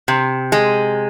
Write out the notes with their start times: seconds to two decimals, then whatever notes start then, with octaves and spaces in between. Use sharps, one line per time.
0.08 C3
0.52 G#3